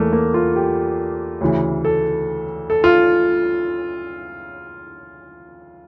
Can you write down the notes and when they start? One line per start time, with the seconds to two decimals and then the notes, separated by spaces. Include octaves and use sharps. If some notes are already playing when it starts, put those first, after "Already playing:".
Already playing: E2 E3 A3 A#3
0.13 A#3
0.34 F4
0.56 G4
1.41 D2 C#3 E3
1.85 A4
2.70 A4
2.84 F4